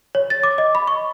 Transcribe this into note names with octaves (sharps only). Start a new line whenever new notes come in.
C#5
A6
D6
D#5
B5
C#6